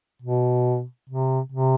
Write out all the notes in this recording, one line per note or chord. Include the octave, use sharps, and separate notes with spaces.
B2
C3
C3